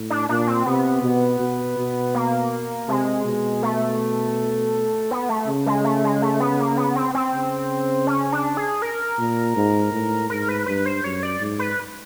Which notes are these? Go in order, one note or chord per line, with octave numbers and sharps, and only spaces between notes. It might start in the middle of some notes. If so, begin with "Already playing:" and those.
Already playing: A2
D4
A#2 D4
C4
C3 B3
B2
B2
B2
A#3
C3 G#3
B2
A3
B3
A3
C#3
G#3
A3
G#3
A3
B3
A#3
B3
C4
C4
C#3
C#4
D4
G#4
A#4
A#2
G#2
A2
G#2 A#4
B4
G2 B4
C5
F#2 C#5
D5
G#2
B4